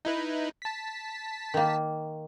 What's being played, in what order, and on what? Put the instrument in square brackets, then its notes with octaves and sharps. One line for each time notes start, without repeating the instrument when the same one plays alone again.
[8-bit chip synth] D#4 E4 B4
A5 B6
[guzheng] D#3 A#3